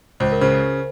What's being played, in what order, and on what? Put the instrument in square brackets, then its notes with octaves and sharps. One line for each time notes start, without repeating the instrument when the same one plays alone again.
[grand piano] C#2 [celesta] C5
[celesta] A#4
[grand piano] C#3 [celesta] C5